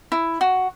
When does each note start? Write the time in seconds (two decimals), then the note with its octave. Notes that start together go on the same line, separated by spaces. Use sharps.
0.12 E4
0.41 F#4